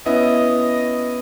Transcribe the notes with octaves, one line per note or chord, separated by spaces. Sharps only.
B3 C#4 E4 D#5